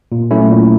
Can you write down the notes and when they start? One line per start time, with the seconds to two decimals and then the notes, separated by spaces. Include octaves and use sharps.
0.12 A#2
0.31 F#3 A3 C#4 E4
0.50 A#2